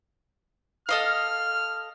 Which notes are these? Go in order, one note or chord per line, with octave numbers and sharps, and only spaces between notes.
A4 D#5 F5 F6